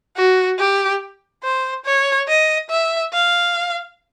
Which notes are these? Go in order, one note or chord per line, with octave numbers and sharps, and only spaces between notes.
F#4
G4
C5
C#5
D#5
E5
F5